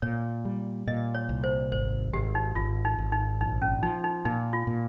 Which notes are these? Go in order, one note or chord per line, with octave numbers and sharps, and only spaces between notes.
A#2 C#5
G3
A#2 D#5
C#5
C2
C5
G#1 C5
G#1 G4
D#4
G#1 F4
D#4
G#1
D#4
A#1 D#4
C#4
F3 D#4
D#4
A#2 D#4
F4
A#2